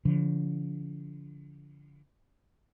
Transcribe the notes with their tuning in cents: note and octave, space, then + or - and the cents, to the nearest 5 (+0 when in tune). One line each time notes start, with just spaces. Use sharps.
D3 -40 F3 -20